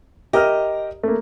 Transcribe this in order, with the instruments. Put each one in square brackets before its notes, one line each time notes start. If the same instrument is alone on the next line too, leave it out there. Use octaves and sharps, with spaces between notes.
[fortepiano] G4 A#4 F6 [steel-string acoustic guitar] D#5
[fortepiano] A3 A#3